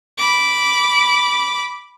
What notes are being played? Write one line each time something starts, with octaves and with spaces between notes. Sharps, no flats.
B5 D6